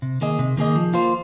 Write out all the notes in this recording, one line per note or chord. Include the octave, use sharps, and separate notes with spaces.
C3
D#3 A#3 G#4 D#5
C3
D#3 A#3 G#4 D#5
F3
A#3 F4 C5